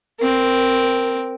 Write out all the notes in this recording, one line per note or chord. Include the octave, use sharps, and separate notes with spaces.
C4 A#4